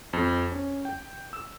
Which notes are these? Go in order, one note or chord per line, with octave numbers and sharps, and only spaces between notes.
F2
C#4
G5
E6